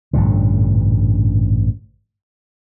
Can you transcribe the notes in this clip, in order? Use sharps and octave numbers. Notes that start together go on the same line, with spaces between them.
A1 G2 A#2 D3